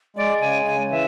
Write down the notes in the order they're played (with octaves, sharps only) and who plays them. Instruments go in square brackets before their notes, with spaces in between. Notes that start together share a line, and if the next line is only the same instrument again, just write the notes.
[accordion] G#3 [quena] D5
[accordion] C#3 [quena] G#5
[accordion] C#3 [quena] G#5
[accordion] E3 [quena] E5